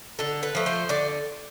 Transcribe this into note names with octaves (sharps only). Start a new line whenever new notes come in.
D3 A4
B4
F3 A3
C5
D3 D5